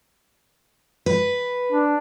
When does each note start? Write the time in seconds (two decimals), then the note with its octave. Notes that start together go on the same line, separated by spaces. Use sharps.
1.06 B4
1.72 D4